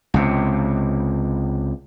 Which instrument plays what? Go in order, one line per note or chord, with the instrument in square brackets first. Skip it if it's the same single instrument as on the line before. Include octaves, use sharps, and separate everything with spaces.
[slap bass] C#2 C3